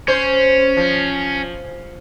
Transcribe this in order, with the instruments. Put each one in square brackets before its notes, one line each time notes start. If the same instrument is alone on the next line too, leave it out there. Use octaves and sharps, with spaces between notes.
[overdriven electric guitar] C#4 [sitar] C5
[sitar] F3